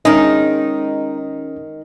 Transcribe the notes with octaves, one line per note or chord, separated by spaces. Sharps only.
D#3 G#3 C#4 D#4